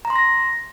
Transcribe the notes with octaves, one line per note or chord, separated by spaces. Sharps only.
A#5
C6
A#6